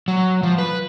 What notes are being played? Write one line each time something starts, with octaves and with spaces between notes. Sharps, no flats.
F#3
F3
B4